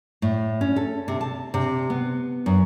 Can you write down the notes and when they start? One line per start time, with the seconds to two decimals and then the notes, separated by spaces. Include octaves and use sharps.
0.22 A2
0.61 C#4
0.76 A4
1.08 C3
1.21 A5
1.54 C3
1.90 B3
2.46 F#2